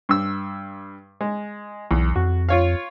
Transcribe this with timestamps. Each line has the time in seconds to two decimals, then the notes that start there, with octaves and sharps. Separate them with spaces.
0.09 G2 E6
1.21 G#3
1.91 B1 E2
2.16 F2 F#4
2.49 F4 C#5 F5